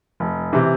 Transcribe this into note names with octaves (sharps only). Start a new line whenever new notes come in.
F1
C3 E3